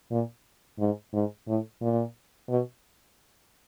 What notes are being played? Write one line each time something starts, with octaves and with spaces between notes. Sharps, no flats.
A#2
G#2
G#2
A2
A#2
B2